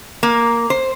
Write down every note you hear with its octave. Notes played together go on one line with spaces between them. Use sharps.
A#3
C5